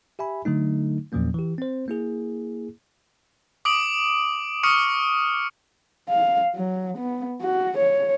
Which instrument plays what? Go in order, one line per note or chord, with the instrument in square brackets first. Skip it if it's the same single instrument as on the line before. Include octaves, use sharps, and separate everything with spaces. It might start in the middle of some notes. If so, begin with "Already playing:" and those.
[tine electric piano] G4 E5 G#5 B5
D3 F#3 A3 D#4
E2 A#2 F3 F#3 A#3 C#4
E3 G4
C4 C5
A#3 E4 G#4
[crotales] D6 D#6 D7 F#7
C#6 D#6 F6 C#7
[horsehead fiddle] F5
F#3
B3
F#4
C#5